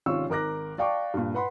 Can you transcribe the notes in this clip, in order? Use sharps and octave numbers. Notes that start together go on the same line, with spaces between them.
G#1 C3 C#4 F4 C#6 E6
G#1 A#4 D6 F#6 A#6
D5 F5 G5 A5 C#6 D6
G2 A#2
B4 F#5 B5 C6